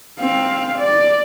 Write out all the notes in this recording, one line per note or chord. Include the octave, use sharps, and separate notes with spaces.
C4 F5
D5